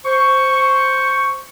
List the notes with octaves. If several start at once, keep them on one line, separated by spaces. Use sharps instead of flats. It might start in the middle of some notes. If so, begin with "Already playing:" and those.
C5 C#6